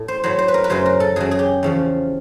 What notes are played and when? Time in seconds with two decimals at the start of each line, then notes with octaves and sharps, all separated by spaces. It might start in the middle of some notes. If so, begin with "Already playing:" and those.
Already playing: A2
0.08 C5
0.24 A2 F#3 C5
0.39 C5
0.48 B4
0.54 A#4
0.64 B4
0.70 F#2 C#3 F#3 C5
0.86 A#4
1.00 A4
1.16 F#2 C#3 F#3 G#4
1.31 G#4
1.39 G4
1.63 E2 C#3 F3